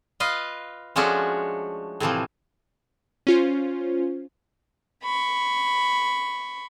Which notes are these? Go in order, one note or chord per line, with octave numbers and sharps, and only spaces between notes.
F4 B4 D#5 F5
F3 G#3 A3 C#4 D4 F#4
A2 C3 E3 F3
C#4 F4 C5
B5 C#6